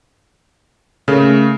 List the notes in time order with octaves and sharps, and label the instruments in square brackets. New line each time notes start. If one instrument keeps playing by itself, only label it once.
[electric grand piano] C#3 [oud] A3 A#3